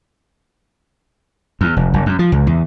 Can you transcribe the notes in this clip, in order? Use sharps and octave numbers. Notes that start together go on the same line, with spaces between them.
E2
F1
F#1
F#2
F3
C#2
E2